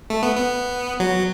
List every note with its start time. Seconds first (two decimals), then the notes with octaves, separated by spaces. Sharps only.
0.10 A3
0.22 B3
0.35 B3
1.00 F#3